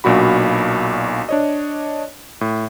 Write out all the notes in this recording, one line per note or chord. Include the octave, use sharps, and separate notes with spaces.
B1 A#2 D4 F#4 B5
D4 C#5 D#5
A2